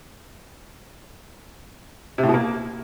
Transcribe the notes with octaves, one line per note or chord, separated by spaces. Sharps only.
C3
A2
B2
A#3